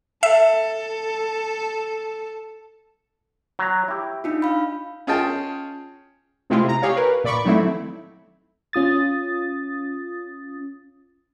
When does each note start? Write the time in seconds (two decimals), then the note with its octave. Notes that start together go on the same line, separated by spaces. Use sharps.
0.23 A4 E5
3.59 F#3 A#5
3.88 E4 G4
4.24 D4 D#4 F4
4.42 F5 B5
5.07 C#4 F4 G#4 D#5 G5 A5
6.50 C3 G#3 A3 C4 E4 F4
6.64 C3 A#5
6.82 G4 G#4 C#5 F5
6.96 A#4 B4
7.24 A#2 D5 B5 C#6 D6
7.45 D#3 F#3 A3 C4 E4
8.73 C#4 F4 D#6 A6